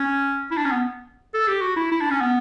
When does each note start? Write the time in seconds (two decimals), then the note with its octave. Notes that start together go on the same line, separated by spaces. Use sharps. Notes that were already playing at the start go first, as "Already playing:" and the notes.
Already playing: C#4
0.51 E4
0.57 D4
0.65 C#4
0.71 B3
1.34 A4
1.47 G4
1.61 F#4
1.76 E4
1.92 E4
2.01 D4
2.11 C#4
2.21 B3